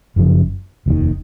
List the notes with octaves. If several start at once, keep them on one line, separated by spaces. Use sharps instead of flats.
F#1 F#2 C#3 F3
F1 D#2 D#3